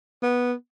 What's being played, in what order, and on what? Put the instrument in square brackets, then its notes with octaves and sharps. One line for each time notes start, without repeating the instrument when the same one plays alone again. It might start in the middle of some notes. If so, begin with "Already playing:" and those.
[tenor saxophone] B3